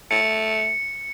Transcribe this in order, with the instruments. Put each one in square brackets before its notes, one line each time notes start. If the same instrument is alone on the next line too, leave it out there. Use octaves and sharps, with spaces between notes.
[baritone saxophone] A3 [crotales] C#7